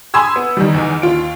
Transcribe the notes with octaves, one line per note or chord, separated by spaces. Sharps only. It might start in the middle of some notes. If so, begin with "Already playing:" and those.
G#5 B5 C6 D#6 E6 G#6
B3
D#3 E3 G3
E2 D#3
D#2 F4 D7